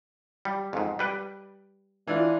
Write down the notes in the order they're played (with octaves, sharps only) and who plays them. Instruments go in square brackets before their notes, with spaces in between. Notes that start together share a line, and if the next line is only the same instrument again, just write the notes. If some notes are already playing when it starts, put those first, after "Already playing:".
[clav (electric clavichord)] G3
F2 G#2
G3 B4 G5
[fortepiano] E3 D4 F4